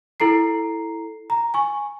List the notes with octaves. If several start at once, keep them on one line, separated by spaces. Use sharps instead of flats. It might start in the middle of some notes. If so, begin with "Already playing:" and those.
E4 A4 A#5 C7
A#5
G#5 C#6